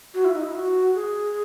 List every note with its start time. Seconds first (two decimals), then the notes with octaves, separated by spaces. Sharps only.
0.14 F#4
0.25 E4
0.34 D#4
0.44 E4
0.55 F#4
0.95 G#4